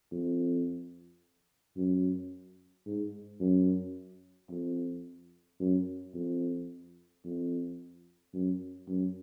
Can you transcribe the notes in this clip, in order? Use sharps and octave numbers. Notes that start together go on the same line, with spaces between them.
F2
F#2
G#2
F#2
F2
F#2
F2
F2
F#2
F#2